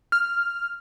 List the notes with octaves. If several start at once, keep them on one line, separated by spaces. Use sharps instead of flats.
F6